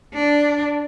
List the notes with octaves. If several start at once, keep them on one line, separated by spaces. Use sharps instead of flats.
D4